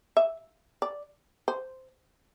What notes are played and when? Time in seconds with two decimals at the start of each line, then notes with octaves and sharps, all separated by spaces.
0.17 E5
0.82 D5
1.48 C5